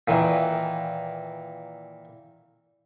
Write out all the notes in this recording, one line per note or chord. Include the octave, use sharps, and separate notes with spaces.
A#2 D#3 E3